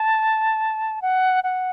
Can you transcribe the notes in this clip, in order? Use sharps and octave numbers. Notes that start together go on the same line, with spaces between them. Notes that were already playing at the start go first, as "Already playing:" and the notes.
Already playing: A5
F#5
F#5